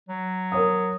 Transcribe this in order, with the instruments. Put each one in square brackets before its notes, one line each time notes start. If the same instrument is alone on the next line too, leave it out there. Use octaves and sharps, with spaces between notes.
[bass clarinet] F#3
[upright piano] A#4 C#5 D#6